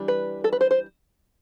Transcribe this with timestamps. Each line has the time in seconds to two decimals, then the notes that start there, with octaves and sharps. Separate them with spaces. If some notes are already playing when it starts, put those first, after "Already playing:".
Already playing: E3 G3 D4
0.08 B4
0.44 A4
0.53 B4
0.61 C5
0.71 C5